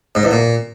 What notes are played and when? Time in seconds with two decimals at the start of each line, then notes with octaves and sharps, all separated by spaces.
0.15 G#2
0.23 E2
0.31 A#2